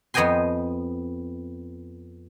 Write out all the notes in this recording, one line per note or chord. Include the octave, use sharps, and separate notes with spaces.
F2 B3 D#5 G5 G#5 C6